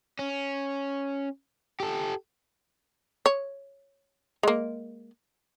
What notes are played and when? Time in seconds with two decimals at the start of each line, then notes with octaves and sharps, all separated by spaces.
0.19 C#4
1.80 G4 A4
3.26 C#5
4.43 G#3 A#3